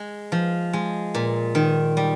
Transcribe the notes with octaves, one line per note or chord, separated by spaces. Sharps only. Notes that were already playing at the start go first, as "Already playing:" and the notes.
Already playing: G#3
F3
G#3
A#2
D#3
G3